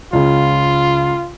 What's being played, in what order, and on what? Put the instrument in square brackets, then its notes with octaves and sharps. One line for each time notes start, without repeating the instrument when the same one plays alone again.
[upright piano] C#2 C#3 [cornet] F4